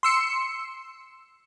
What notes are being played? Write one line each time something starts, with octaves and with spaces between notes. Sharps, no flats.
C6 E6 C#7